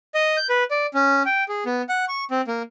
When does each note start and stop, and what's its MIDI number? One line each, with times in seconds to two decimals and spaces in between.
0.15 0.37 75
0.37 0.47 91
0.50 0.64 71
0.71 0.86 74
0.94 1.23 61
1.26 1.44 79
1.49 1.64 68
1.66 1.82 59
1.89 2.05 78
2.08 2.24 85
2.31 2.42 60
2.48 2.62 58